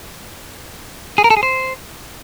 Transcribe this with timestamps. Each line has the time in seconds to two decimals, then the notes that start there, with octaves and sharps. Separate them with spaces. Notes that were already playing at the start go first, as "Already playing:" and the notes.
1.18 G#4
1.24 A#4
1.30 A4
1.37 G#4
1.43 C5